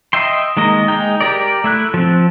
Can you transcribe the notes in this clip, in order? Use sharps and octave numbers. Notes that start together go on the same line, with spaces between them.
D#5 E5 G5 C6
D#3 G#3 A#3 D#5
G#3 D#4 G5
G4 A#4 D5
A3 E4 F#6
F3 C4